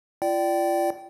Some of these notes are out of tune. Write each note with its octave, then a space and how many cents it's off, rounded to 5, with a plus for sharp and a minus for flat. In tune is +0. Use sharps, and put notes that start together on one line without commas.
F4 -35 D5 +0 G5 -25